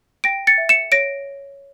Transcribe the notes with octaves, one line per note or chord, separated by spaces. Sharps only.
G5 A#6 D7
A6 C#7
E5
C#7 E7
C#5 A#6 D7